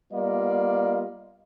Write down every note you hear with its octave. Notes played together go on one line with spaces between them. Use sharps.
G3 A#3 B3 F4 D5 D#5